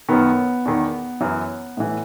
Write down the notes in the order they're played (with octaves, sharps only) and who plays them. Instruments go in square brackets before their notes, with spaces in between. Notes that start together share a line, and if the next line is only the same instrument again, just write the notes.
[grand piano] F#2 D#3 B3
E2 D#3
F#2 E3
A2 E3